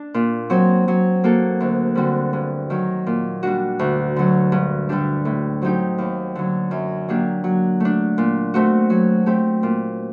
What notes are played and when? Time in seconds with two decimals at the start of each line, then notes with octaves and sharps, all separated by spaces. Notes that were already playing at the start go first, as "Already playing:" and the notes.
Already playing: D4
0.14 A#2
0.50 F#3 C4
0.88 F#3
1.24 A#3 F#4 A4
1.60 D2
1.95 D3 G3 C4 F#4
2.33 G2
2.70 D#3 F#3
3.07 A#2
3.43 G3 D4 F#4
3.79 D2
4.16 D3 F#3
4.52 G2
4.89 D3 G3 D4 G4
5.25 A2
5.62 F#3 C4 D#4 G4
5.98 D#2
6.35 D3 F#3
6.71 F#2
7.08 F#3 A#3 D4 G4
7.44 F#3
7.80 A3 D4
8.18 A#2
8.54 A3 C4 F#4
8.90 F#3
9.26 A3 C4 G4
9.63 A#2